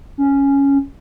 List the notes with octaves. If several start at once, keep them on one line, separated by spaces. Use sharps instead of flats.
C#4